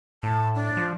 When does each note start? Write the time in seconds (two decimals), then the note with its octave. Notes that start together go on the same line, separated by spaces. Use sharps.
0.23 A2 A5
0.55 D4
0.77 F3